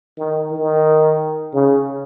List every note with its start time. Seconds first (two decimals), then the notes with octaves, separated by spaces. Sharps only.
0.18 D#3
0.52 D#3
1.54 C#3